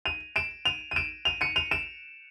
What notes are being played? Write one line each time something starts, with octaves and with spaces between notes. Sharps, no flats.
D#7 F7
D7 E7
D#7 F7
D#7
D7 E7
D#7 F7
C#7 D#7
D#7 F7
D7 E7